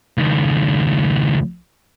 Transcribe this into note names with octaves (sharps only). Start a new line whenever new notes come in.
C#2 D#3